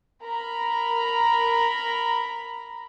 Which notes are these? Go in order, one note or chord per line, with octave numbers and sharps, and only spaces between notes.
A#4 A#5 B5